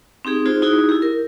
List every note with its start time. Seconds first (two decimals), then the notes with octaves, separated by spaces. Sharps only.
0.25 C4 D#4 G4 G#4
0.46 D#4 F4 G#4 C5
0.62 D#4 E4 F#4 G#4
0.89 E4 G4
1.02 A#4